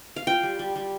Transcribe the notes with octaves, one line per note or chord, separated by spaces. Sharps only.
F5
F4 G5
G3
G3
G3